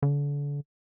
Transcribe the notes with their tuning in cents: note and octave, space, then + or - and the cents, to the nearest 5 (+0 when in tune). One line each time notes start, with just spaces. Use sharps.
D3 -35